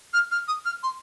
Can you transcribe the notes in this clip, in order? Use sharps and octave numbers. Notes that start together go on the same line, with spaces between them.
F6
F6
D#6
F6
C6